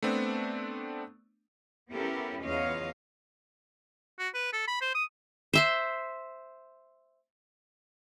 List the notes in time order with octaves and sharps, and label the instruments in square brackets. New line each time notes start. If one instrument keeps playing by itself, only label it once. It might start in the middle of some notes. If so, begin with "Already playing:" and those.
[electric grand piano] A3 B3 C4 D4
[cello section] B3 C#4 E4 G4 A4 A#4
E2 F4 C#5 D#5 F5
[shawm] F#4
B4
A4
B5
C5
D#6
[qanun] C5 E5 C6